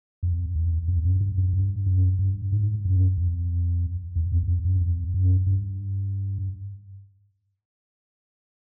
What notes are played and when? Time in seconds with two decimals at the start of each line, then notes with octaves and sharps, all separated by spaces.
0.23 F2
0.55 E2
0.88 F2
1.05 F#2
1.21 G2
1.38 F#2
1.53 G2
1.86 F#2
2.19 G2
2.52 G#2
2.85 F#2
3.17 F2
4.16 E2
4.32 F2
4.48 F2
4.65 F#2
4.81 F2
5.14 F#2
5.46 G2